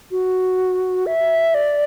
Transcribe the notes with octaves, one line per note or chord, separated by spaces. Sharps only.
F#4
E5
D5